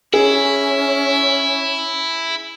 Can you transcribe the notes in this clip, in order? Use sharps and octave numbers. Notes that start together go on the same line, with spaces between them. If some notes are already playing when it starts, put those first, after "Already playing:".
C#4 E4 G#4